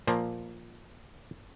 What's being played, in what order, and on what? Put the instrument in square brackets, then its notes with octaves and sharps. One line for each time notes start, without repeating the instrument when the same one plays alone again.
[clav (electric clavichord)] A#2 F3 A#3